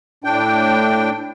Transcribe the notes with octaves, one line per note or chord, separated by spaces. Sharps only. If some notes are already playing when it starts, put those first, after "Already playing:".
A2 D4 G5